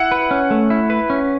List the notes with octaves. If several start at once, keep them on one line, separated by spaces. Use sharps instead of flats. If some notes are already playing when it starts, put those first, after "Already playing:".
Already playing: E4 F#5
B4
C#4
A3
E4
B4
C#4